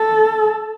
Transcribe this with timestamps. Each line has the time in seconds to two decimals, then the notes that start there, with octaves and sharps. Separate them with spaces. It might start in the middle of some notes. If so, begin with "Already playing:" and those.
Already playing: A4